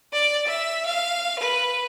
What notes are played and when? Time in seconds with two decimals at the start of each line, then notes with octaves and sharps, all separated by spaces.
0.12 D5
0.47 E5
0.86 F5
1.39 B4